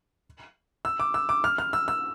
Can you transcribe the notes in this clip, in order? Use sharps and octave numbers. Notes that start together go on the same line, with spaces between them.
E6
D6
E6
D6
F6
F6
E6
E6